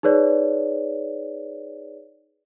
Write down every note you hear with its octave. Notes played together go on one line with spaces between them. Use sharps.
D#4 G#4 B4 C#5 D5